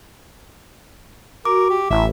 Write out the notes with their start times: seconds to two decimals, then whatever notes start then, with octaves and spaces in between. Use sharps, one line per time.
1.45 F#4 A#4 D6
1.70 G4
1.91 A1 E4 E5